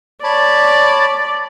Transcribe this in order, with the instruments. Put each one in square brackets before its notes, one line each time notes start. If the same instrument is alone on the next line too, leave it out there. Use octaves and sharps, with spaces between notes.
[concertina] C#5 A5 B5 [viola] D5